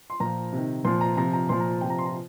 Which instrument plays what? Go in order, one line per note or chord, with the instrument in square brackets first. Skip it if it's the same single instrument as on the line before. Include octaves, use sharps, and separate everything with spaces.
[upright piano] C6
A#2 A#5
F3
C3 D#3
A#2 F3 C6
A#5
C3 F3 A#5
A#5
A#2 F3 C6
A#5
C3 F3 G5
A#5
C6
A#5